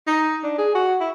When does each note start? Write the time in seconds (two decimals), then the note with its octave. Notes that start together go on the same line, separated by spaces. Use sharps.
0.07 D#4
0.44 D4
0.58 G#4
0.75 F#4
1.00 E4